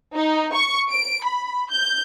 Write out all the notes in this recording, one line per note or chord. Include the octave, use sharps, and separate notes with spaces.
D#4
C#6
D7
B5
G6